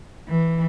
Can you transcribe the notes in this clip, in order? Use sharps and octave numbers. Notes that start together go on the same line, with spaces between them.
E3